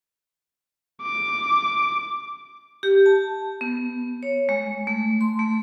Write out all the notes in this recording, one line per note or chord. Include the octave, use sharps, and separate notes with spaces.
D6
G4
A5
B3
C#5
G#3
A3
C6
A3